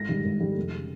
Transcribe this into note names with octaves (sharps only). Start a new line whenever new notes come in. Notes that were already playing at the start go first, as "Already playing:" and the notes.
Already playing: G#1 A#6
G#2 D#3 G3
G#1
G#2 D#3 G3
F1
C#3